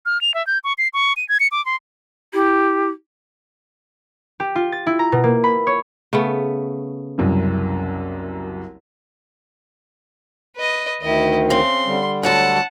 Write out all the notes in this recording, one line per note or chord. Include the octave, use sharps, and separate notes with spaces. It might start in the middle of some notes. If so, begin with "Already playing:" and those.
F6
F7
E5
G6
C#6
C7
C#6
D#7
G#6
C#7
D6
C6
E4 G4
G4
F4
A6
E4
A#5
B2
A#3
B5
C#5
C#3 A3 B3
F#1 C2 F#2
B4 D#5
D2 D#3 E4 D#5
C#3 C4 C6
D3 G3
D2 F#3 A4 F#5 A5